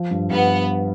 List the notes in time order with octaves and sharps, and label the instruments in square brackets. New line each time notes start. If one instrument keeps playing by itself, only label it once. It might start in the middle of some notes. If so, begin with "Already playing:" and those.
Already playing: [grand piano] F3
G2
[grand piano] G2 [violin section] B3